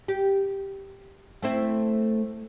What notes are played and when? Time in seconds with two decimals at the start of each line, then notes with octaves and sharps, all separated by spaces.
0.08 G4
1.42 A3 C4 E4